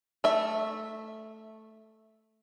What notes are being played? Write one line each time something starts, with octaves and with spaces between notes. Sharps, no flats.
A3 E5